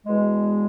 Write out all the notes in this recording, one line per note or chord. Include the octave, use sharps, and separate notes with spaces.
E2 B2 G#3